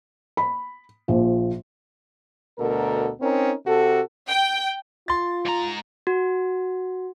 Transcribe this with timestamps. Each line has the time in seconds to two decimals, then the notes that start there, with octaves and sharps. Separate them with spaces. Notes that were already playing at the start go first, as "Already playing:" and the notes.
0.37 B5
1.08 A#1 F3
2.59 D2 B2 A4 A#4
3.21 C4 C#4 D#4 A#4
3.66 C3 F#4 A4
4.28 G5
5.08 F4 C6 A6
5.46 G#2 A#5
6.07 F#4